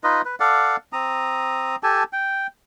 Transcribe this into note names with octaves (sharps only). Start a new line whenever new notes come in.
D#4 F4 B4 D#5
B4
A4 D5 F5 F#5
C4 A#5 D#6
G4 A4 G#5 A5
G5